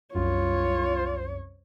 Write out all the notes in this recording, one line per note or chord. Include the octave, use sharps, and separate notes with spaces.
C2 F#2 F4 C#5